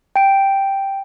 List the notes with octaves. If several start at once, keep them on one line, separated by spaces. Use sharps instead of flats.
G5 D7